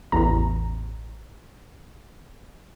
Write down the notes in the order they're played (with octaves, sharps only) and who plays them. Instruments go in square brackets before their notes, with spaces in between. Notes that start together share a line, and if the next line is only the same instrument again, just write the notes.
[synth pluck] A1 E2 A#5